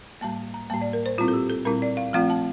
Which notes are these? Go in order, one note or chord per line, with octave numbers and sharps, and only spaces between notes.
A2 G3 A#3 A5
A#5
A2 G3 A#3 A5
D5
A#4
C5
A#2 G3 C4 E4 F4
A4
G4
A4
A#2 G3 C4 E4 A#4
D5
F5
F3 A3 C4 F4 F5
A5